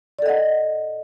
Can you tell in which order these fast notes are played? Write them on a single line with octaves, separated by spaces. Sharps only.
D5 A4 D#5 F#5